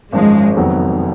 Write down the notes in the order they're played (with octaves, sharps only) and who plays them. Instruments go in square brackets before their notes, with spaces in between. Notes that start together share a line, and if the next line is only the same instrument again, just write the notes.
[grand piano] G#1 F#2 F3 [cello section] G#3
[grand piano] F1 F2 D#3 F#3 B3